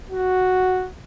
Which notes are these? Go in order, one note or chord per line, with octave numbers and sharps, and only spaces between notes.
F#4